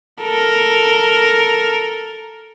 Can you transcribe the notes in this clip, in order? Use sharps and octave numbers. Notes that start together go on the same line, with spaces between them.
A4 A#4